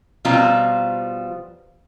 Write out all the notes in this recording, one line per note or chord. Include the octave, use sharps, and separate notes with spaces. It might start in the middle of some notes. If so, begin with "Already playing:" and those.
B2 F3 G3 C4 F4 A#5